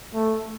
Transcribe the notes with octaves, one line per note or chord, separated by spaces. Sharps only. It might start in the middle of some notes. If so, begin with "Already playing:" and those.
A3